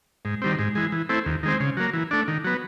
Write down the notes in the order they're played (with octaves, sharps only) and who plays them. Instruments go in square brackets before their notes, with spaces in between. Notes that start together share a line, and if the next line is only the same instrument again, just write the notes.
[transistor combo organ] G#2
D#3 G3 C4
G#2
E3 G#3
E3
A3 C4 E4
D#2
D#3 G#3 C4
C#3
F#3 A#3
E3
A3 D4
D#3
F#3 B3